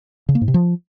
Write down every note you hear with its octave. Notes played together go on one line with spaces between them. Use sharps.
C#3
A#3
G#2
C3
F3